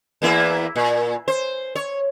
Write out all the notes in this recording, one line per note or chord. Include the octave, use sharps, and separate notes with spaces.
E2 A#3 E4
A#2
C5
C#5